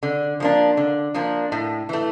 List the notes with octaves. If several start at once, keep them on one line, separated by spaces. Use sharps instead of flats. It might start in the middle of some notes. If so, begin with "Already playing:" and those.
D3
F3 A#3 D4
D3
F3 A#3 D4
A2
E3 A3